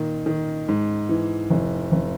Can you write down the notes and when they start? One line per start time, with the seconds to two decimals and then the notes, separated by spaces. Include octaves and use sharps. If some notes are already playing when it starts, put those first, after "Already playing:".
Already playing: A#2 D#3
0.26 D#3
0.68 G#2
1.09 E3
1.50 F1
1.92 F1